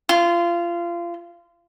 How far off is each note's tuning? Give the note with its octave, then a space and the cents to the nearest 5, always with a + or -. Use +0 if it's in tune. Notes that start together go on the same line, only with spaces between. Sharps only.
F4 -25